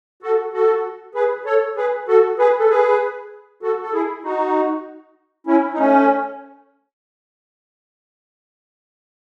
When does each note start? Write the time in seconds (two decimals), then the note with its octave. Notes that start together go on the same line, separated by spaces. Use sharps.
0.23 F#4 A4
0.53 F#4 A4
1.15 G#4 B4
1.45 A4 C#5
1.76 G#4 B4
2.08 F#4 A4
2.38 G#4 B4
2.59 A4
2.69 G#4 B4
3.63 F#4 A4
3.82 A4
3.92 E4 G#4
4.24 D#4 F#4
5.47 C#4 E4
5.74 D#4
5.78 A3 C#4